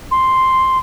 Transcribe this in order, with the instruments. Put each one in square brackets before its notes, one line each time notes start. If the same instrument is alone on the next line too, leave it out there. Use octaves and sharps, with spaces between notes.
[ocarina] C6